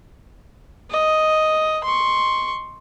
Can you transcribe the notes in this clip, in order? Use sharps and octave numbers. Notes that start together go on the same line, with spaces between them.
D#5
C6 C#6